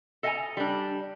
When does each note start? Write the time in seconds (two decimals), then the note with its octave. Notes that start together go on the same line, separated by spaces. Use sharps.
0.23 A4 D#5 F5 G5 G#5 A#5
0.57 G3 D4